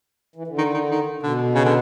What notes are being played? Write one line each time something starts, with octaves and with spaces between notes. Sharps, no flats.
E3
D3
D#3
D#3
D#3
B2 D3
C#3
D3